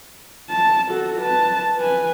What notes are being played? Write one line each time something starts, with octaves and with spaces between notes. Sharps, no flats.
A5
F#4 A4
B4 A5
B4 G#5